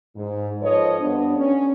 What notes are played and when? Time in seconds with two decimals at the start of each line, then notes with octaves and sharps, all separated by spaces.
0.15 G#2
0.60 F3 A4 B4 C#5 D#5
0.99 G2 B3 D4
1.36 C#4